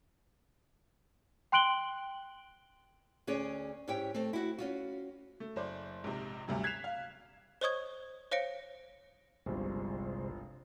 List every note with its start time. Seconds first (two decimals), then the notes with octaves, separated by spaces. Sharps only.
1.52 G5 C6 F#6 D7 F#7 G7
3.27 D2 C#4 G#4 C#5 D5
3.88 G#2 C#4 E4 G4 C#5 G5
4.14 A3 C4
4.33 E4 F#4
4.58 C#4 F4 F#4
5.40 A3
5.56 F#1 C5 D5
6.04 A#1 G#2 C3
6.48 D2 G2 C3 F#3
6.63 F#6 G#6 B6 C7 E7 F7
6.84 F5
7.61 C5 C#5 D#5 C#6 D#6 G#6
8.31 C5 C#5 F5 A#6 C#7 D7
9.46 G1 C2 C3 F3 G#3 C5